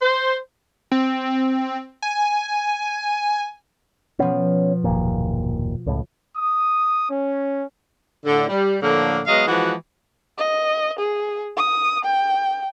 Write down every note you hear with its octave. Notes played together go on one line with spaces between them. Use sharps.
C5
C4
G#5
B2 F3 B3 C#4
F#1 D#2 A#2
C#2 A2
D#6
C#4
A2 D3
G3
A2 D3 F3 A#3
F#3 G#3 B3 D#5 F5
E3 F3 G#3 F#4
D#5
G#4
D#6
G5